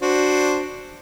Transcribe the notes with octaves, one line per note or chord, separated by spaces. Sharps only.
D4 F#4 C5